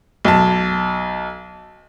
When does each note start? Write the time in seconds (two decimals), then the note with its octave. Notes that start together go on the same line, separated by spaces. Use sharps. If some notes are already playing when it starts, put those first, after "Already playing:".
0.25 B1 A5